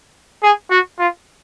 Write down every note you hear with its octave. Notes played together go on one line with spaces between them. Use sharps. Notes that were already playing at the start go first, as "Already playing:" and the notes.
G#4
F#4
F4